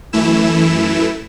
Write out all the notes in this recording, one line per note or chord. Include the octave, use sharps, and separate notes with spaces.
F#2 E3 A3 E4 E7